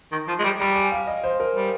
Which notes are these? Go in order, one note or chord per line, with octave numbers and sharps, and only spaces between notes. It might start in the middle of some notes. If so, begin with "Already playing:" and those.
D#3
F3
G#3
G3
G3 A#5
G#5
F5
D#5
C5
A#4
G3